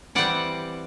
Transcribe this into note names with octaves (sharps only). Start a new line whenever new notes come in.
E3 G3 C4 D5 F#5